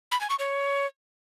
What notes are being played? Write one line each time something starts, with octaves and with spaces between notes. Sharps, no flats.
B5
G#5
C#6
C#5